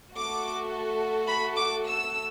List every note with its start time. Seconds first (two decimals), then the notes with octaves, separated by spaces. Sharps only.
0.15 A3 F#4 A4 D6
1.27 B5
1.56 D6
1.85 E6